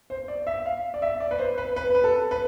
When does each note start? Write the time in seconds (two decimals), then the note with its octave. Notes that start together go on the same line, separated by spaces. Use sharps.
0.10 C5
0.28 D5
0.47 E5
0.66 F5
0.94 D5
1.02 E5
1.20 D5
1.31 B4
1.39 C5
1.58 B4
1.76 B4
1.95 B4
2.04 A4
2.31 B4